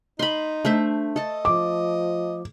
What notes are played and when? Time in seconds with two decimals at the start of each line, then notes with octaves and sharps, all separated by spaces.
0.19 D#4 B5 C6
0.65 A3 D4 C5 E5
1.16 A4 D#5 A5
1.45 F3 D6